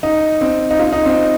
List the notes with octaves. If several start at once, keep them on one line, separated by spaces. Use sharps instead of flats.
D#4
C4
D#4
F4
D#4
C4